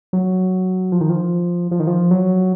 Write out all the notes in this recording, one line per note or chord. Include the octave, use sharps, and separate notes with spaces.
F#3
F3
D#3
F3
F3
D#3
F3
F#3